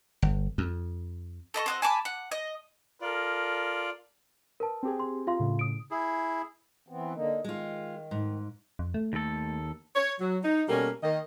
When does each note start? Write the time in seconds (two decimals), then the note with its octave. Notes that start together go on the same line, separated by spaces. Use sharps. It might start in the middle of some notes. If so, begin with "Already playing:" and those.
0.22 G1
0.58 F2
1.54 A4 D#5 B5 C#6
1.66 C4 F#4 D#5
1.82 G#5 A5 B5 D6
2.05 F#5
2.32 D#5
3.02 F4 A4 A#4 D5
4.60 A#4 B4 A5
4.83 C4 G4 G#4
5.00 C6
5.27 F4 F5 C6
5.39 A2 C#3
5.59 D#6 D7
5.91 E4 G#4
6.88 E3 B3 C4
7.14 D3 A#3 D#4
7.44 D#3 G#3 F4
8.11 G#2
8.79 F2
8.94 A3
9.13 D#2 A4
9.95 C#5
10.20 F#3
10.44 D#4
10.69 B2 G3 A#3 C#4 A4 A#4
11.03 D#3 A#3 D#5